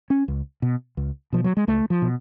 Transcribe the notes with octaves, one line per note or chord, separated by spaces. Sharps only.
C#4
C#2
B2
C#2
B2 F3
F#3
G#3
C#2 A3
F3
B2